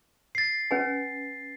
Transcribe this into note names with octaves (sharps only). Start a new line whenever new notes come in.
A6 C7
C#4 B4 G#5